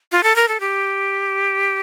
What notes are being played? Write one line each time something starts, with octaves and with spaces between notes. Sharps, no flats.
F4
A4
A#4
A4
G4